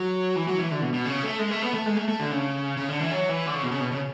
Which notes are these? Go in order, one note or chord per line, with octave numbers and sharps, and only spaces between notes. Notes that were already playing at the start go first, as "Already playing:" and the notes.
Already playing: F#3
E3
F#3
E3
D3
B2
B2
C#3
A3
G#3
A3
B3
A3
G#3
A3
A3
D3
C#3
C#3
D3
E3
F#3
E3
D3
C#3
B2
C#3
B2
C#3